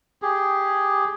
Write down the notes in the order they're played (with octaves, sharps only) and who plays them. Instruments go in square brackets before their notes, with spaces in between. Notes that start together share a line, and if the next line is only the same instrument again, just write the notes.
[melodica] G4 G#4